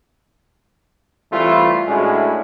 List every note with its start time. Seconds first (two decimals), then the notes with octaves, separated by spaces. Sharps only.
1.32 E3 G3 A3 C4 E4 F4
1.88 A2 G#3 C#4 D4 E4 F#4